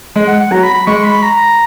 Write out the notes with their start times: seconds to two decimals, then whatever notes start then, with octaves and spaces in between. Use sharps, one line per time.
0.16 G#3
0.27 F#5
0.39 F#5
0.51 F#3 A#5
0.63 B5
0.75 B5
0.87 G#3 C#6
1.04 B5
1.23 A#5